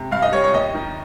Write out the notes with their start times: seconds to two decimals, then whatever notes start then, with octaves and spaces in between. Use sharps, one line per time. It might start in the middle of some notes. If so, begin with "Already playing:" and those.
Already playing: C3
0.11 G2 F5
0.22 D#5
0.32 G3 C#5
0.44 C#5
0.54 D#2 D#5
0.74 D#3